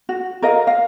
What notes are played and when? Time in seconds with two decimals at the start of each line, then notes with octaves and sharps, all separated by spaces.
0.09 F#4
0.42 A#4 D#5 F5
0.67 F5